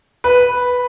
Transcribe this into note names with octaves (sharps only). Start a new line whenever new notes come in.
B4